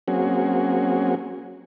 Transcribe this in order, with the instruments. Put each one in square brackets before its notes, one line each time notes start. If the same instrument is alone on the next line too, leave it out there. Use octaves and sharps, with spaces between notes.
[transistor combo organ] F#3 A#3 C4 C#4 F#4 G#4